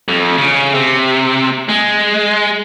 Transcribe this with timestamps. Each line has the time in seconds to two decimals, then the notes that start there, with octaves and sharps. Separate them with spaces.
0.08 F2
0.38 C#3
0.75 C3
1.69 G#3